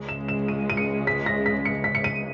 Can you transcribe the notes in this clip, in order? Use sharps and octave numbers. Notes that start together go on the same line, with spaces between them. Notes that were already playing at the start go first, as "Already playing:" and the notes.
Already playing: C#2 C#3 G#3
E7
E7
D#7
D#7
C#7
B6
A#6
B6
C#7
B6
C#7
D#7